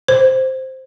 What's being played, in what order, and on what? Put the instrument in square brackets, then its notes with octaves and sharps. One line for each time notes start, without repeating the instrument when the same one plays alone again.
[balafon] C5